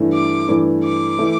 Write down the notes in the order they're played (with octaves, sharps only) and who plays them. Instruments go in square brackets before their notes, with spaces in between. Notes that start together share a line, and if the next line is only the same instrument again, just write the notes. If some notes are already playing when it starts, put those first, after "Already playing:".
Already playing: [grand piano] G2 E3 A3
[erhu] D6
[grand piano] G2 E3 A3
[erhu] D6
[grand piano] E3 A3